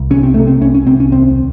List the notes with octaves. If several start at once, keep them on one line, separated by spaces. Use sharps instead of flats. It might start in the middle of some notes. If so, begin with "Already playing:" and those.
Already playing: C2
C3 C#4
C4
C3 A3
C4
C2 C#4
C#4
C2 C4
C#4
D#2 C4